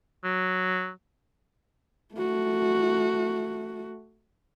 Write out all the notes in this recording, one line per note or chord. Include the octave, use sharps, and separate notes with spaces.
F#3
A3 F#4